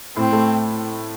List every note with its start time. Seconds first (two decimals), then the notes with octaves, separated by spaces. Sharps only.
0.16 A2 C4
0.32 A3